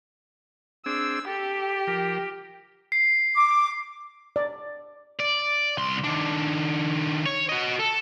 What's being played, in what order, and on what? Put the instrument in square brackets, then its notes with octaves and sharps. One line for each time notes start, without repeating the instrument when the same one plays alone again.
[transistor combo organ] C4 D4 G#4 [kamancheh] E6
[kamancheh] G4 [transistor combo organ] A4
[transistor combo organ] F3 A#4
[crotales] C7
[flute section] D6
[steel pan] D5
[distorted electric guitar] D5
C2 C6
D#3 D4
C#5
F#4 D#5
A4